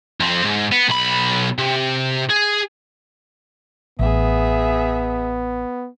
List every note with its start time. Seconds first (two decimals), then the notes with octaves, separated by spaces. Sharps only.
0.20 F2 C4
0.44 G#2
0.72 B3
0.89 B1 B5
1.58 C3
2.29 G#4
3.99 A1 B3 G#4 E5